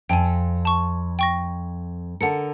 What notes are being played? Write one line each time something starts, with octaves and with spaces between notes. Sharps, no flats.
F2 G5 G#5
A5 C#6
G5 C#6 A#6
D3 A4 A#4 F#5 C#7